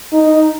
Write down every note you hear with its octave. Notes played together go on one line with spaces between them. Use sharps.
D#4